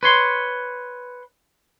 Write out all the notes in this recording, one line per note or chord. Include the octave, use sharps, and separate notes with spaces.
B4 C#5 C6